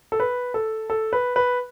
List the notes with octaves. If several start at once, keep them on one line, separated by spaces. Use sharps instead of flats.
A4
B4
A4
A4
B4
B4